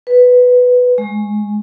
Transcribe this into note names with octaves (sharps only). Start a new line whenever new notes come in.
B4
G#3